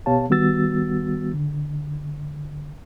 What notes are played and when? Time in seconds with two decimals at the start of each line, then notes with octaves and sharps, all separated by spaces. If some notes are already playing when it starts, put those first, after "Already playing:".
0.06 B2 B3 G4 C#5 F5 A5
0.30 D#3 G3 B3 F#4 E6 A6
1.33 D3